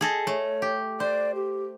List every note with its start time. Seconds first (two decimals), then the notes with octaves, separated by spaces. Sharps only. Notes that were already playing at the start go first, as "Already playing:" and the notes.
0.01 G#4 A4 D#5
0.27 A3 C#5
0.62 G4
1.00 C5 D5
1.35 G4